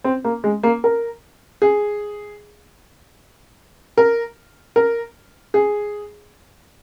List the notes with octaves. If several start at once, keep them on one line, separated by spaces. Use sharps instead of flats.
C4
A#3
G#3
A#3
A#4
G#4
A#4
A#4
G#4